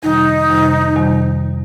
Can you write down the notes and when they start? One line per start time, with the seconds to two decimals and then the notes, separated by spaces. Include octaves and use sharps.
0.03 F2 C3 D#3 G3 D#4
0.49 F2 C3 D#3 G3
0.96 F2 C3 D#3 G3